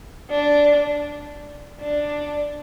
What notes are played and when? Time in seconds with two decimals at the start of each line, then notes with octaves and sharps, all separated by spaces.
0.31 D4
1.81 D4